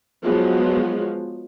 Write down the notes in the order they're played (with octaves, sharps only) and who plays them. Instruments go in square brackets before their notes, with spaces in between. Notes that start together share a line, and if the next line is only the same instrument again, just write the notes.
[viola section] F3 F#3 G#3 B3